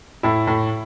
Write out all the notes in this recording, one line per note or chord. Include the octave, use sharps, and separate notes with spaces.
A2 E4
A2